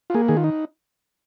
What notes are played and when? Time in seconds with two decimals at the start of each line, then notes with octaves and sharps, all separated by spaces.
0.10 F4
0.14 A#3 G#4
0.28 D#3 G#4
0.37 F4
0.44 D#4